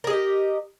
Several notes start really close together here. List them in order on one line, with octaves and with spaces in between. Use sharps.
A#4 G#4 D#5 G4